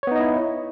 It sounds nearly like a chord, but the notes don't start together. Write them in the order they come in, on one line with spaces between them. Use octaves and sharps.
C#5 B3 D#4 D#5 E4